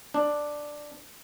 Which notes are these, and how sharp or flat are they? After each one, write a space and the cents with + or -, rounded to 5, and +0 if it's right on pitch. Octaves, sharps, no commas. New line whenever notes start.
D4 +5